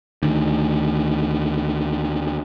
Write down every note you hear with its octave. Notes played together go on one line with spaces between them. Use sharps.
D2 D#3